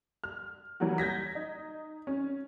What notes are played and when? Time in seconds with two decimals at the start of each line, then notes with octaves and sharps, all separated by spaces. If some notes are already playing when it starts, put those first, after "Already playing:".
0.24 F6
0.80 E3 F#3 G3 A#3 F#4
0.98 G6 G#6 A#6 B6
1.35 D#4
2.07 C#4